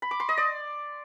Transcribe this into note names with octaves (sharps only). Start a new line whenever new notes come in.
B5
D6
C6
D#5
D5